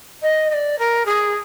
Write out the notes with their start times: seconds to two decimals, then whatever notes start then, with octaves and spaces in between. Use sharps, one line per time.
0.22 D#5
0.50 D#5
0.53 D5
0.78 A#4
1.05 G#4